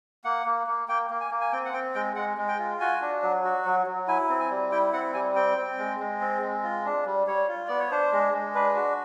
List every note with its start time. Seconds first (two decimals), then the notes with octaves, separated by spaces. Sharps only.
0.24 A#3 F#5
0.46 A#3
0.67 A#3
0.88 A#3 G5
1.10 A#3
1.21 G#5
1.31 A#3
1.41 G#5
1.52 C4 G5
1.65 F#5
1.73 C4 G5
1.95 G#3 G5
2.16 G#3 F#5
2.37 G#3
2.48 G5
2.59 F4
2.80 F#4 G#5
3.01 D4
3.23 F#3
3.45 F#4
3.65 F#3
3.87 F#3
4.08 E4 G#5
4.29 C4
4.40 G#5
4.51 G3
4.72 E4 G5
4.93 C4 F#5
5.14 G3 G#5
5.35 C4 G5
5.57 C4
5.78 G#3
6.00 G#3
6.21 C4
6.42 G#3
6.63 F4
6.85 D4
7.06 G3
7.27 G3 C#5
7.48 F4
7.68 B3 D5
7.79 C#5
7.91 D4 C5
8.12 G#3
8.33 G#3
8.55 D4 B4
8.76 F#4